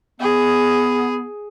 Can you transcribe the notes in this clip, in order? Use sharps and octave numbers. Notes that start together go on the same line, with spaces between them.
B3 G#4